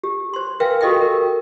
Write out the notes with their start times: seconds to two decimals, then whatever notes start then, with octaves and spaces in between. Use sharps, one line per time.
0.04 G4
0.34 C5 C6
0.60 A#4 B4 E5 F5 G5 G#5
0.81 F#4 G4 A4 D#5 E5 G5
1.01 A#4